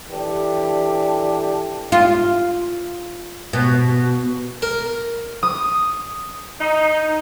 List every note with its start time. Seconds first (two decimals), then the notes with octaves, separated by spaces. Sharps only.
0.11 E3 D4 G4 A4
1.92 F4
3.53 B2
4.62 A#4
5.43 D#6
6.60 D#4